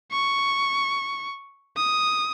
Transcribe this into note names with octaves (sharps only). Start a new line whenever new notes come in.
C#6
D#6